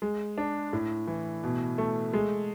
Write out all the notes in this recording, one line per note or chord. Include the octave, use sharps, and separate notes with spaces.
G#3
D4
A2
E3
B2
A3
G#3